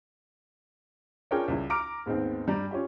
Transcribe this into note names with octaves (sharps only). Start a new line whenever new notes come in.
C#4 D4 F4 G#4 A#4 G5
C#2 G3 E4
A#5 D6 F6 D7
D#2 G#2 B3 C4
G2 G3 D5 A#5
C#4 F4 G4